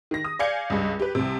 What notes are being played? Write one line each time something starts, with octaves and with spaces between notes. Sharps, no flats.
D#3 A#6
D#6
D5 F5 G#5 G6 G#6 C#7
C#2 G2
G4 B4
C2 C3